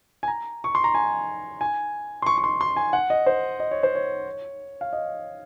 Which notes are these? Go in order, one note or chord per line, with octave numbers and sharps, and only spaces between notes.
G#5
A#5
C#6
C6
A#5
G#5
G#5
C6
C#6
C#6
C6
C6
G#5
F#5
D#5
C5
D#5
C#5
C5
C#5
F5
D#5